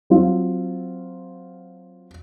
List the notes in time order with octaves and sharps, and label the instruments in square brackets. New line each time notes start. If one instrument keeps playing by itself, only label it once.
[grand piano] F#3 C4 F4